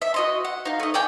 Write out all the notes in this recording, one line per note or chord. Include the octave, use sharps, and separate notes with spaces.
E5
F#4 D#5 C6
F#5
D#4 F5
A3 D#5
D5 F5 G5 G#5